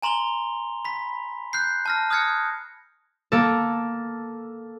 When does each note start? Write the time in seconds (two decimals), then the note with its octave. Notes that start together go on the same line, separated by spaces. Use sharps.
0.02 G#5 A#5 C6 F7 G7
0.85 B5 B6
1.53 F#6 G6 C7
1.86 A5 F6 A#6
2.10 D#6 F6 F#6 G#6 A#6 C#7
3.32 A#3 A4